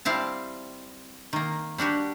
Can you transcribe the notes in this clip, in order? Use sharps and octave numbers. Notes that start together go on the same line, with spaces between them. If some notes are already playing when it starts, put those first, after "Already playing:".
G3 C4 E4 F5 A5
D#3 A#3
G3 D4 F#4 G4